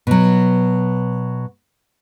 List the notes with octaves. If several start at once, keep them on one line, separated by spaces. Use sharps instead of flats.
B2 F#3